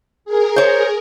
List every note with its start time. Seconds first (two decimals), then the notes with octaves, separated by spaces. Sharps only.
0.25 G#4 A#4
0.56 C5 C#5